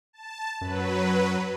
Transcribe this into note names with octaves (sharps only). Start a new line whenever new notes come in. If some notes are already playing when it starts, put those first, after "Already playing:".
A5
F#2 F#3 B4